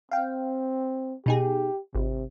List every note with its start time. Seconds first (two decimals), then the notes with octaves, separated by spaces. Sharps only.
0.11 C4 F5 G5
1.26 B2 D#4 G4 G#4
1.95 G#1 C3